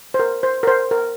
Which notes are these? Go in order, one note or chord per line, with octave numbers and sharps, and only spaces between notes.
C5
A#4
C5
A#4
C5
A#4